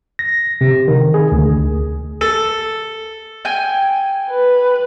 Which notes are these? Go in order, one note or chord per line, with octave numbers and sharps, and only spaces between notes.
A#6
C3
D#3
G#4
D2
A4
G5 G#5
B4